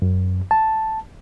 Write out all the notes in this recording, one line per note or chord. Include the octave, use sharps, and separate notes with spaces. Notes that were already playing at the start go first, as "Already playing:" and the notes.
F#2
A5